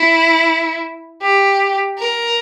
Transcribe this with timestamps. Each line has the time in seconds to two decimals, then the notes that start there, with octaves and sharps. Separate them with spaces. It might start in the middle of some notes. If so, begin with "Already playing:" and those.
Already playing: E4
1.21 G4
1.98 A#4